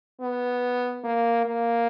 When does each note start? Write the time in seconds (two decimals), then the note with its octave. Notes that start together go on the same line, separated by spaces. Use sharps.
0.20 B3
1.04 A#3
1.46 A#3